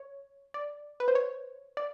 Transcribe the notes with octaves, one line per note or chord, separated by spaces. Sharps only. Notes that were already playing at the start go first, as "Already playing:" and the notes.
Already playing: C#5
D5
B4
C5
C#5
D5